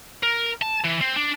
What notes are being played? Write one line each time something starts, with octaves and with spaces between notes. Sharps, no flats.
A#4
A5
E3
C4
D4